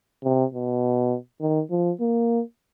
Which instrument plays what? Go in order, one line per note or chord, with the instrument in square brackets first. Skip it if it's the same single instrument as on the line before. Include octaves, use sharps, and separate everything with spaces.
[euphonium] C3
B2
D#3
F3
A#3